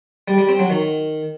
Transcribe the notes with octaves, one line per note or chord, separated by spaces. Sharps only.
G3
G3
C4
F#3
D#3